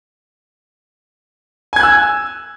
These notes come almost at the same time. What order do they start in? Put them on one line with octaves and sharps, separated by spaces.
G#5 G#6 F#6 E6